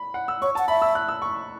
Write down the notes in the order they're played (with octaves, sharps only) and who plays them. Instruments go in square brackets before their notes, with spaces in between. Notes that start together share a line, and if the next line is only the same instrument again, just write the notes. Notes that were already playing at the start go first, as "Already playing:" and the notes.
Already playing: [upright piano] B5
F#5
E6
[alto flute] C#5 [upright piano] C#6
[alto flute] F#5 [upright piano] A5
[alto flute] E5 [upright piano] B5
[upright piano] E6
F#6
E6
C#6